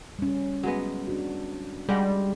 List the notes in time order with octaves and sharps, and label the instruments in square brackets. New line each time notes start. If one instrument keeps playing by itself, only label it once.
[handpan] G3 C#4
[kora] F#3 G#3 B3
[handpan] D4 F#4
[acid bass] G3 [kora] G#3 F#5